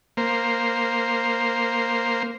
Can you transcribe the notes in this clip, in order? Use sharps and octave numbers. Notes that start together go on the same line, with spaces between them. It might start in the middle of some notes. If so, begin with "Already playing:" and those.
A#3 C5